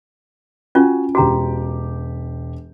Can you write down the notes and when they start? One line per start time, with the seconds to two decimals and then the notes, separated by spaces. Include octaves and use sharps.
0.75 C#4 F4 F#4 G#5
1.15 E1 F#4 G4 A#5 D6